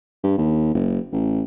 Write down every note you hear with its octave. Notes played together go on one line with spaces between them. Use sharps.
G2
D#2
F#1
A1